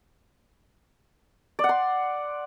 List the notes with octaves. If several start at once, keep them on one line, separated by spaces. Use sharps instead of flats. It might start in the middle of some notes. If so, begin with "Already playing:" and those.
D5
F#5
C6